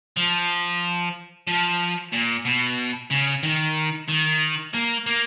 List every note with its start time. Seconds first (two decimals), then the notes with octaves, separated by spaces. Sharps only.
0.17 F3
1.48 F3
2.13 A#2
2.45 B2
3.11 C#3
3.43 D#3
4.09 D#3
4.73 A#3
5.06 A#3